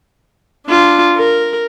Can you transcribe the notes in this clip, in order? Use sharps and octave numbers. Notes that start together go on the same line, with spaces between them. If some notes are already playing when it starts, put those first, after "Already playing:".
D4 F4
A#4